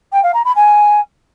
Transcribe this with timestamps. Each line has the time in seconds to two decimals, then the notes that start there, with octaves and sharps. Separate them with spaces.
0.12 G5
0.23 F5
0.34 A#5
0.45 B5
0.56 G#5